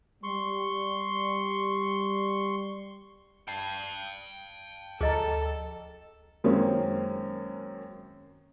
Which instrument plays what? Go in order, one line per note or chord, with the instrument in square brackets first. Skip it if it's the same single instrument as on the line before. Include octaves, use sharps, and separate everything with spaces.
[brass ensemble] G3 [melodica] C6 C#6
[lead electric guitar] G5 A5 [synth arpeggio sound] C7
[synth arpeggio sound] D2 F3 C#7 [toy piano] G#4 D#5 A#5 [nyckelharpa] A4
[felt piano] F#2 D#3 G#3 A#3 C4 C#4